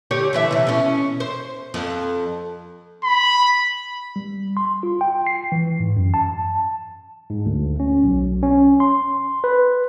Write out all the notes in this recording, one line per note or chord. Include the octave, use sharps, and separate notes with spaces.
D3 G4 C#5
D3 E3 E5
C3 E3
B2 C#4
C5
F2
B5
G3
C6
F4
G5
C7
E3
G#2
F#2
A5
G#2
D2
C#4
B1
C#4
C6
B4